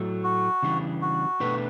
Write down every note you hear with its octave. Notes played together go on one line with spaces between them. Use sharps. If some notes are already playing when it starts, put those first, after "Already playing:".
Already playing: A2 F#3 A3
F#4
C#3 E3 G3 D4 G4
F#4
B2 A3 D4 G4 B4